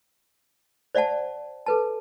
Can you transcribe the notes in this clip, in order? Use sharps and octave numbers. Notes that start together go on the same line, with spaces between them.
C5 D5 E5 F#5 A5
A4 B4 A5